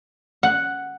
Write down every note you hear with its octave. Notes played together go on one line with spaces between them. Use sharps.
F#5